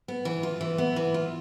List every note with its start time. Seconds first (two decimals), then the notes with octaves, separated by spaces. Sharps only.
0.08 B3
0.25 E3
0.43 F4
0.61 E3
0.78 B3
0.96 E3
1.14 F4